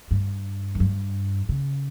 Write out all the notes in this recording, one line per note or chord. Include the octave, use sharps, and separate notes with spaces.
G2
F#2
G2
C#3